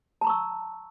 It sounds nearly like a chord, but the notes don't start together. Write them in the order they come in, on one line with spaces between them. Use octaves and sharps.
A5 A#5 C#6 E6